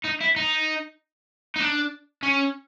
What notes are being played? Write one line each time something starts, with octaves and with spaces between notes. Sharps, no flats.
D#4
E4
D#4
D#4
D4
C#4